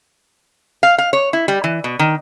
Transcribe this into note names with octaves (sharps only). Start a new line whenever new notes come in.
F5
F5
C#5
E4
G3
E3
B2
D#3